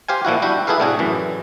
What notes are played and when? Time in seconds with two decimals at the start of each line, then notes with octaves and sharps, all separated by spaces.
0.08 G4 C5 F5 G#5
0.25 A#2 F3 E4 F#4
0.42 G3 D4 E4 F#4 G4
0.67 E4 G#4 A4 B4 F5
0.80 A2 C3 D4 F#4 G#4
0.99 F#2 A2 E3